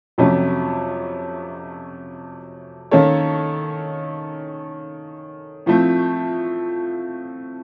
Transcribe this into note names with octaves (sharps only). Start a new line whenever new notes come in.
F2 C3 F#3 A3 C#4
D#3 A#3 C#4 A4 C#5
A2 F3 A3 C4